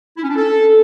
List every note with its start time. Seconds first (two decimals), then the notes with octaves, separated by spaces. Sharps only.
0.17 E4
0.23 C#4
0.30 D4
0.36 A4